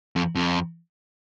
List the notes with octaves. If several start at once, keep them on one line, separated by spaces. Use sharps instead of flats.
F2
F2